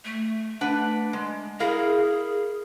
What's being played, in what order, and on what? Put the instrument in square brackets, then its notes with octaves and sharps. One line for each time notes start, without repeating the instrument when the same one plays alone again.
[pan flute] A3
[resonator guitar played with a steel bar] D4 B4 F#5
G#3
[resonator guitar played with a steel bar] E4 A#4 F5 [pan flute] G#4